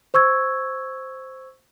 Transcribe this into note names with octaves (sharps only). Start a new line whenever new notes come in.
C5 C#6 E6 G#6